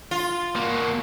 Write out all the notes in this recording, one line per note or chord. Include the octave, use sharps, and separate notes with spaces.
F4
A#3 F#4